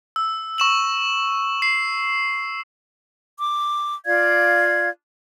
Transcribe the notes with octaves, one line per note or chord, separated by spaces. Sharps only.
E6
C#6 E7 F#7
C7
D6
F4 D5 F5 G#6